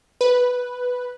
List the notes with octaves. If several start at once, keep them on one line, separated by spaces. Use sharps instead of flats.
B4